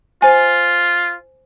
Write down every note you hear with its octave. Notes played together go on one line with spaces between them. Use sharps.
F4 C5 G#5